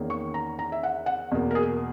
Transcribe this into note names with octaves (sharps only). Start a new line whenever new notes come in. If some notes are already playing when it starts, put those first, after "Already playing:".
Already playing: E2 D#3 A#3 C#4
C#6
A#5
A#5
E5
F#5
F#5
E2 B2 A#3
A#4
G#4